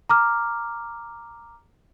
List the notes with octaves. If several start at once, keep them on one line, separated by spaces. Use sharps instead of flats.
A#5 D6 F6